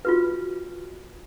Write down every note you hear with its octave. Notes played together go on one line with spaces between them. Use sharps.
F4 F#4 B4